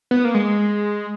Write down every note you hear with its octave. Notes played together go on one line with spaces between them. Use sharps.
B3
A#3
G#3